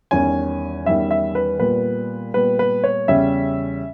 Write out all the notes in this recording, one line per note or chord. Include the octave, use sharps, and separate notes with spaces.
E2 D#3 G3 C#4 G#5
E2 D#3 G3 C#4 E5
E5
B4
A#2 G3 B3 B4
A#2 G3 B3 B4
B4
C#5
E2 C#3 G3 C#4 E5